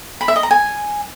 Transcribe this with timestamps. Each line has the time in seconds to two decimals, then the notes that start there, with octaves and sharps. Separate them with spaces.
0.21 B5
0.28 E5
0.36 D#5
0.43 A#5
0.51 G#5